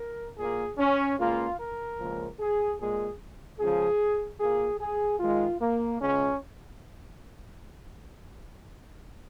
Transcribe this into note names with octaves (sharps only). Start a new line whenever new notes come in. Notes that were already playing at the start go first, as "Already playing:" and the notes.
Already playing: A#4
A#2 A#3 G#4
C#4
C#2 C#3 A#3 F4
A#4
C#2 C#3 F3 A#3
G#4
A#2 G#3 G#4
C#2 C#3 F3 G#4
A#2 A#3 G#4
G#4
G#2 D#3 G#3 F4
A#3
C#2 C#3 G#3 C#4